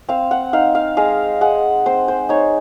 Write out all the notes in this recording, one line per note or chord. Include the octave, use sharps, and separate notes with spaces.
C4 F5
F#5
D#4 F5
F5
G#3 F5
G#3 F#5
C4 C5
C5
D#4 C#5